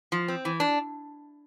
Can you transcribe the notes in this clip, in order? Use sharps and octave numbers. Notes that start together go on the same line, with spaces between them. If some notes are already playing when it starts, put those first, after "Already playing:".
F3
C4
E3
D4